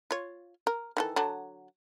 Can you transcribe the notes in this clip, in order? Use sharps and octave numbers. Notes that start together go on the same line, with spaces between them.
F4 C#5
A#4
D#3 E3 A4
D3 F#3 A5